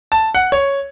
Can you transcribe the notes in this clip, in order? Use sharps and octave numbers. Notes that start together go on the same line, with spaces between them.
A5
F#5
C#5